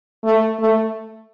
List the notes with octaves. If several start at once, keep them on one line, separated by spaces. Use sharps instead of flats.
A3
A3